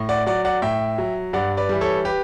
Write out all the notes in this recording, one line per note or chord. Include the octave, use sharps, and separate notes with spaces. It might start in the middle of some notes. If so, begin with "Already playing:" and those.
Already playing: A2
D5 F#5
F#3 D5 F#5
D5 F#5
A2 E5 G5
F#3
G2 D5 F#5
B4 D5
E3 G3
A4 C#5
G4 B4